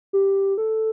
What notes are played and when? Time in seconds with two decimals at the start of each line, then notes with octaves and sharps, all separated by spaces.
0.13 G4
0.58 A4